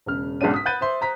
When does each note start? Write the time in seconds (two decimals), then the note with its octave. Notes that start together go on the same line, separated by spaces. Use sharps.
0.06 E1 C#3 F6
0.41 B1 G#2 C#3 D4 D#7
0.54 D#6 B6
0.66 F#5 B5 F#6 G6 A6 D#7
0.81 C5 E5 C6
1.01 C5 A#5 B6